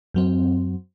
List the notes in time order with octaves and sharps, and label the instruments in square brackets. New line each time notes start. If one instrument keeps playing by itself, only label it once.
[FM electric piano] F#2 F#3 C4